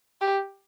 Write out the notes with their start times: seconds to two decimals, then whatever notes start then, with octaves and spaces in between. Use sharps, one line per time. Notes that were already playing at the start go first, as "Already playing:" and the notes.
0.21 G4